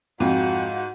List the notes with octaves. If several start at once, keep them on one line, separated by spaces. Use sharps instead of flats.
F2 G#2 F4 F#4